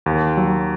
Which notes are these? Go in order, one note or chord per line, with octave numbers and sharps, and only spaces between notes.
D#2
F#3